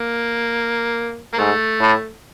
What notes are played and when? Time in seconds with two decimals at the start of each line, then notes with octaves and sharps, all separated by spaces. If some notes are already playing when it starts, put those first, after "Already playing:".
Already playing: A#3
1.33 A#3
1.38 G#2 A3
1.80 A2